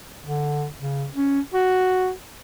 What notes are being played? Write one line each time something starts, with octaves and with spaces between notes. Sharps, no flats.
D3
C#3
C#4
F#4